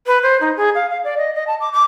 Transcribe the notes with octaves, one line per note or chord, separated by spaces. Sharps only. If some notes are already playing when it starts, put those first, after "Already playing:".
B4
C5
D#4
G#4
F5
F5
D5
D#5
D#5
A5
D6
D6